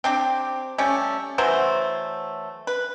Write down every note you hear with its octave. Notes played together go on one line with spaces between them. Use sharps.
C4 D4 G4
G3 A3 C#4
E3 F#3 A3 C5
B4